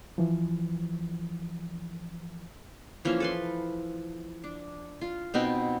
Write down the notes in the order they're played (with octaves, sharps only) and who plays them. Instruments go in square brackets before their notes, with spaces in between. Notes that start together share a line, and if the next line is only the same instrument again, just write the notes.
[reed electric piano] E3 F3
[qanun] E3 F3 A#3 C#4
A4 B4 C6
D4
F4
B2 B3 C4 D#4